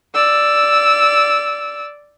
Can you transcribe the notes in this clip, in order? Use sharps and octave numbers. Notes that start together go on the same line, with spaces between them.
D5 E6